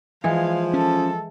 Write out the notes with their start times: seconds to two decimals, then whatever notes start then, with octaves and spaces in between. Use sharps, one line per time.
0.24 E3 F3 G#3 G#4 F5
0.73 C#4 A4